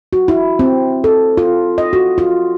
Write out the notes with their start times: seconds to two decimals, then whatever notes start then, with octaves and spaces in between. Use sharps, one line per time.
0.13 F#4
0.28 E4
0.59 C4
1.04 A4
1.37 F4
1.78 D#5
1.93 F#4
2.18 F4